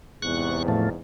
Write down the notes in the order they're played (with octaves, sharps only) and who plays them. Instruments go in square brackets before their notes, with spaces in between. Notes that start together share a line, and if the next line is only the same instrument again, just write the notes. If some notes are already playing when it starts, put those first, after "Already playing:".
[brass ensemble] E2 G#2 C3 [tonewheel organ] C#6 F#6
[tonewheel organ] A2 F3 A3